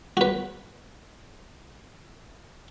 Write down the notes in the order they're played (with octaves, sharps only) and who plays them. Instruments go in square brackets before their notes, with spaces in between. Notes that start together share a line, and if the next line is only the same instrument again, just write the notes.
[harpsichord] F#4 B4